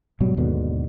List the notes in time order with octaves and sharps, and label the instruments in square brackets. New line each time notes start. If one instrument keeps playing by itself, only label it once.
[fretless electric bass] G#2 B2 F#3 G3
D#2 G#2 B2 D3